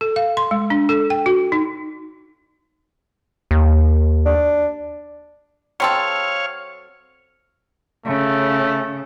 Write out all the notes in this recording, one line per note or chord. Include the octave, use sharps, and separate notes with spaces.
A4
F5
C6
G#3
D4
A4
G5
F#4
D#4
D#2
D4
F#3 C4 A4 C#5 F5
C#3 A3